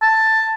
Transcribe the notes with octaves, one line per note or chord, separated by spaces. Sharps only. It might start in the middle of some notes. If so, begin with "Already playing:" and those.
A5